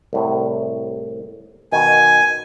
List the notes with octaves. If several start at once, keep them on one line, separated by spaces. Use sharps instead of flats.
C2 A2 C3
B2 D#3 G#5